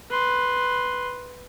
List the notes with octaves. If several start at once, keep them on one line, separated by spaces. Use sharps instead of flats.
B4 C6